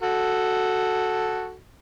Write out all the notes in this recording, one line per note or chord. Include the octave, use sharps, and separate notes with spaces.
F#4 A4